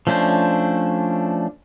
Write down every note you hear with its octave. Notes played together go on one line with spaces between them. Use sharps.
F3 A3 C#4 D4 C5